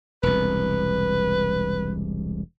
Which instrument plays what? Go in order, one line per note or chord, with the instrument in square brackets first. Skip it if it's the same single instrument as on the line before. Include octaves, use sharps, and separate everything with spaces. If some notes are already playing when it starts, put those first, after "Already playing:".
[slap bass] E1 C2 [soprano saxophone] B4